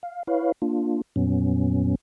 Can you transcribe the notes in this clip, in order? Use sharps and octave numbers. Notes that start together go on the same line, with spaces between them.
F5
E4 B4 C#5 F5
A#3 D4 F4
F2 A#2 F#3 B3 C#4